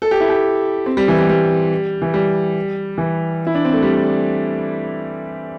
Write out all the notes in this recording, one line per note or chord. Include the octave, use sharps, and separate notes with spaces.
A4
G4
E4
G4
C4
G3
E3
G3
G3
E3
G3
E3
E4
D4
C4
A3
G3